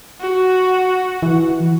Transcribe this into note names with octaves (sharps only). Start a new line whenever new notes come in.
F#4
E3